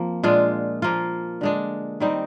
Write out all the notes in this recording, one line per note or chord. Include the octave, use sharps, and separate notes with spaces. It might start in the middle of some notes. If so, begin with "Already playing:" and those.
Already playing: F3 A#3 C4
A#2 G#3 D4 F4
F3 A#3 F4
D3 G#3 D4
D#3 G3 C4 D#4